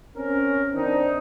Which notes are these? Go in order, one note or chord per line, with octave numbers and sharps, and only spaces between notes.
C4 C#4 A#4
D#3 C4 D4 D#4